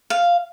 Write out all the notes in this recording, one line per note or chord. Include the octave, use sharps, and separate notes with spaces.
F5